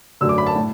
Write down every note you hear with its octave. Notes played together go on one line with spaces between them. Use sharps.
F#2 D3 F#3 A3 E6
D6
B5
A5
A2